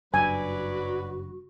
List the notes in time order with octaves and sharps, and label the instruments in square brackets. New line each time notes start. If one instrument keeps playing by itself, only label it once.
[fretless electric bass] F#1 G2 [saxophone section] F#3 B4 D5 [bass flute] F#4 [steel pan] G#5